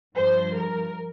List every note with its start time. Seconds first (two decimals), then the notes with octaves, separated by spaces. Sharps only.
0.15 G2 F3 C5
0.56 A#4